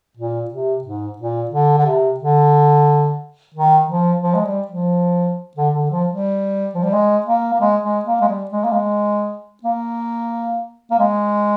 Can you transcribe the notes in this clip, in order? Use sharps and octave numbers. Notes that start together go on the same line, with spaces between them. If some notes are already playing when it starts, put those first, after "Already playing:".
A#2
C3
G#2
A#2
D3
D3
C3
D3
D#3
F3
F3
G#3
G3
F3
D3
D3
F3
G3
F3
G3
G#3
A#3
A#3
G#3
G#3
A#3
G#3
G3
G#3
A#3
G#3
A#3
A#3
G#3